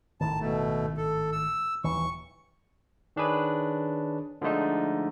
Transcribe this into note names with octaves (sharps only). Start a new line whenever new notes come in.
G#1 A2 D#3 A5
B2 A3
A4
E6
D#1 D#2 E3 C#6
D#3 D4 G#4 B4 C#5
D3 F3 G#3 A3 D#4